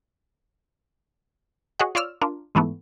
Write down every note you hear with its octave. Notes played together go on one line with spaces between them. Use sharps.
F#4 G#4 C#5 D#5 F#5
F4 C#5 D5 E6 F6
D4 F4 A#4
G#2 E3 A3 B3